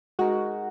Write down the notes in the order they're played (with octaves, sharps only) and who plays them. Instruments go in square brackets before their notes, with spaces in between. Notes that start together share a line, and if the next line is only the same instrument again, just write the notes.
[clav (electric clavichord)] G#3 D#4 A#4 [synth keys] F#4